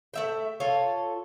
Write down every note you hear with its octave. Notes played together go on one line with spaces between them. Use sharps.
A3 E5 G5
F4 A4 C#5